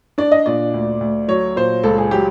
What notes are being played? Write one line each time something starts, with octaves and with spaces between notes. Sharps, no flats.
D4 D5
D#5
A#2 D5
D2
D2
F#3 C#5
A#2 C5
C#2 A4
G#4
F#3 G4